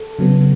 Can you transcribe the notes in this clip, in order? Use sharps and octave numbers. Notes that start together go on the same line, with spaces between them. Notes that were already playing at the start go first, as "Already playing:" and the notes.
Already playing: A4
C#3 F#3 B3